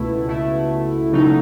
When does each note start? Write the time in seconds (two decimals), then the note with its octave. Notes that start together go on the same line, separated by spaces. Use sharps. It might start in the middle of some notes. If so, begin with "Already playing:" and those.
Already playing: C#2 B2 A3 E4
0.26 C#2 B2 A3 E4
1.12 C#3 F#3 A3 D#4